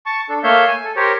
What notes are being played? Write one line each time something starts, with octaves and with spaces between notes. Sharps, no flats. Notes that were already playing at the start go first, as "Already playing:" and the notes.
A5 C#6
D4 A4
A3 A#3 C#5 E5 F5 G6
G#5
A4
G4 A#4 C5 C#5